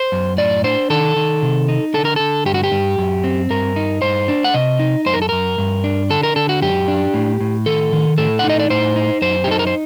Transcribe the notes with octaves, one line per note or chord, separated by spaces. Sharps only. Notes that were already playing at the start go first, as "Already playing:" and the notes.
Already playing: C5
F#2
A2 D5
D4 C5
D#3 A4
D#3
C3
D#4
D3 A4
A#4
D3 A4
G2 G4
F#4
G4
G2
F#2
C4
G2 A#4
D#4
G2 C5
D4
F#5
C3 D#5
D#4
F#2 C5
A#4
A4
F#2 A#4
G2
D4
D3 A4
A#4
D3 A4
F#4
F#2 G4
D4
A2
A2
D#3 A4
D#3
A2 A4
D#4 F#5
D#5
D5
A2 C5
D#4
F#2 C5
G4
D#4 A4
A#4
C5